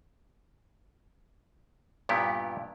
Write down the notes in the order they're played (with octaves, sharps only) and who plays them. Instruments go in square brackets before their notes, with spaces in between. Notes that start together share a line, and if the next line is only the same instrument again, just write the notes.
[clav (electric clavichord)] G2 A#2 B3 E4 G4